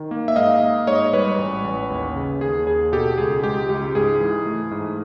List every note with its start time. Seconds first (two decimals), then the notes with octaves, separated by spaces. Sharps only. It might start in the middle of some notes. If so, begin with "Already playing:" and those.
Already playing: D#3
0.11 A#3
0.28 E5
0.36 G#2 D#5 F5
0.62 A#3
0.87 G#2 C#5 D#5
1.13 G3 B4 C#5
1.39 A1
1.64 A1
1.90 D#2
2.16 C#3
2.41 D#2 G#4
2.67 D#2 G#4
2.92 B2 G4 A4
3.18 C#2 G#4
3.43 G#3 G4
3.69 C#2 G4
3.95 G#2 G#4
4.20 E3
4.46 A3
4.71 G#2